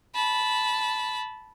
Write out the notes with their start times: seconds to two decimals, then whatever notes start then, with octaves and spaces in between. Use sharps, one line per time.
0.15 A5 B5